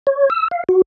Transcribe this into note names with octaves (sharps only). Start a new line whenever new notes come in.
C#5
E6
F5
F#4